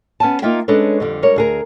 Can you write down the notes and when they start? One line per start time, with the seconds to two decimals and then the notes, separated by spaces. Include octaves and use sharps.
0.20 B3 C#4 G#5 A5
0.42 A#3 D#4 F4 E5 G5
0.68 G#3 C#4 D4 A4 B4 C#5
1.00 F2 D3 G3
1.22 G3 G#3 A#4 C#5
1.36 D2 G#4 A#4